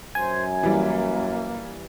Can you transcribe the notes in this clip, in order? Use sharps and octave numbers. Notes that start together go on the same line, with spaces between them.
F#2 C5 G#5
E3 G3 A#3